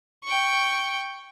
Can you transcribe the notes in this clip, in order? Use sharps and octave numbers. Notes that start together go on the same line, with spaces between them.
G5 C#6